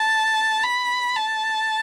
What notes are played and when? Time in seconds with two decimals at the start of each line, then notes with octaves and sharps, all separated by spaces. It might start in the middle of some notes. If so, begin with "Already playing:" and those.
Already playing: A5
0.63 B5
1.16 A5